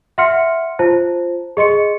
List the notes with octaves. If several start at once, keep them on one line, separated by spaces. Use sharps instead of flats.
E5 F#5 C6 F6 C#7
F4 C5 A5
G#4 D#5 C6 C#7